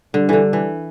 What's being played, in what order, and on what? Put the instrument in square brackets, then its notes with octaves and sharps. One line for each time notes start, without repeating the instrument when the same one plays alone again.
[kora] D3 [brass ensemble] G3 D4 A4
[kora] D3 E3
E3